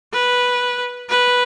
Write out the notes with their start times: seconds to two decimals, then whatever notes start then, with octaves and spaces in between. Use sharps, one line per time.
0.13 B4
1.09 B4